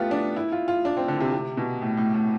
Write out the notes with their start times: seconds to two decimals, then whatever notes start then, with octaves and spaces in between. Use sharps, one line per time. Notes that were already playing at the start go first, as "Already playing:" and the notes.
Already playing: A3 B3 F4 G4
0.11 D4
0.36 E4
0.52 F4
0.68 F4
0.85 D4
0.97 C4
1.08 D3
1.20 C3
1.33 C3
1.57 B2
1.82 A2
1.97 A2
2.14 A2